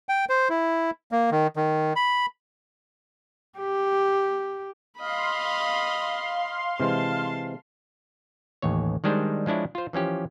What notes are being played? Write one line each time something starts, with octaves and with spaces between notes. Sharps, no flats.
G5
C5
E4
A#3
D#3
D#3
B5
G4
D#5 F5 B5 C6
C3 E3 G#3 A5
A1 D#2 C#5
D#3 G3 G#3 D4 C5
F3 G#3 D4 E4 C#5
F4 C5
E3 F3 C#4 G4